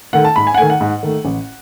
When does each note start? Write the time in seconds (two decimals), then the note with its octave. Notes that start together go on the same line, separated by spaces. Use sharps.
0.13 D#3 A3 F#5
0.25 A5
0.36 G#2 B5
0.47 G#5
0.54 F#5
0.58 D#3 A3 G#5
0.70 F#5
0.81 G#2
1.03 D#3 A3
1.25 A1